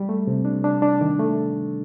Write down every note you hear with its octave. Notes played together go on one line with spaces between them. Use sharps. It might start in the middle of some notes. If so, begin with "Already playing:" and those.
Already playing: G3
A3
C3
D4
D4
D4
D#3
A3